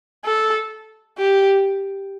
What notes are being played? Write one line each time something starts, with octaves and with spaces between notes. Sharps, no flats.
A4
G4